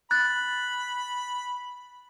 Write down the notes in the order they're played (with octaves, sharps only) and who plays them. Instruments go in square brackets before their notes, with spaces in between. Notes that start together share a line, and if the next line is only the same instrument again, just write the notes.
[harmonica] B5 [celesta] F#6 A6